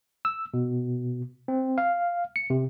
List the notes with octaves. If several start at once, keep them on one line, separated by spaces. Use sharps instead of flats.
E6
B2
C4
F5
C#7
C3